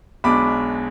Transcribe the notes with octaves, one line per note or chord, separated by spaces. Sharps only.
B1 B2 G#3 D4 B5 D6